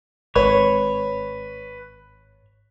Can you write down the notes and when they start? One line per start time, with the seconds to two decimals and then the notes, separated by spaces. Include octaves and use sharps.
0.35 G#1 B4 C#5